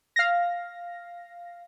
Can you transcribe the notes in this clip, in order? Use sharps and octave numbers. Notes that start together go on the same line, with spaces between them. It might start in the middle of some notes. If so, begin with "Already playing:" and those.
F5 A#6